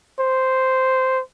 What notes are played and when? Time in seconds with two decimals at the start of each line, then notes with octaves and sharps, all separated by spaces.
0.20 C5